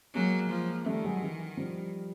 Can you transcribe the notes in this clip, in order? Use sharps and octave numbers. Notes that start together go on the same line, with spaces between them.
F#3 G#3 A#3
F3
D#3 G3 A3
F#3 G#3
E3
F3 G3